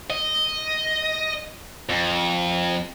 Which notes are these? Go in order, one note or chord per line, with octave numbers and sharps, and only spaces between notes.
D#5
F2